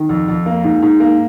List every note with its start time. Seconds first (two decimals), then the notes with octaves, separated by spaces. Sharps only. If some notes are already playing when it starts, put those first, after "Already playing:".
Already playing: D#3
0.09 F2
0.28 F2
0.46 A#3
0.64 G#2
0.82 G#2
1.00 A#3